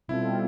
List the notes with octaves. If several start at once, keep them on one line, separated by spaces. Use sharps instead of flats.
B2 G3 C4 E4 F4 A4